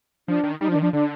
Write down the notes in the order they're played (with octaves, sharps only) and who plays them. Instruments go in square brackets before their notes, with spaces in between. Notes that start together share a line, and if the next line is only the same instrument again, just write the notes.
[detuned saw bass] F3 [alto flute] D4
[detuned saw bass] D#3
[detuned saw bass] G3 [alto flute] D#4
[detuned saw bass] F3
[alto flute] D4
[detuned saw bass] D#3
[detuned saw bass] F3 [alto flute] D4
[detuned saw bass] D3 [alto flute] D4